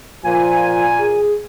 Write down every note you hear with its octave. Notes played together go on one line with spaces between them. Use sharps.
A#2 F3 G#5
G#4